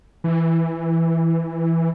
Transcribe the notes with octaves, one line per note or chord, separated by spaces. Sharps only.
E3